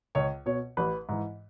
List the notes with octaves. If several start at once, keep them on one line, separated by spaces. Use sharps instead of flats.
C#2 C#5
B2 C#5
A1 B4
G#2 E3